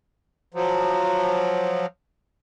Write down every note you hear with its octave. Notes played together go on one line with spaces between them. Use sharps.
F3 F#3